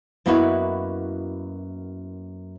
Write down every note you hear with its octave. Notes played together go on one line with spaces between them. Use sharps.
F#2 A#3 B3 D#4 E4 F#4